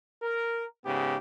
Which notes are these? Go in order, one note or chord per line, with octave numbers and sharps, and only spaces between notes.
A#4
G#2 C#3 B3 G4